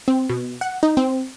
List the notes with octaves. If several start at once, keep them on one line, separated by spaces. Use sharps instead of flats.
C4
B2
F#5
D#4
C4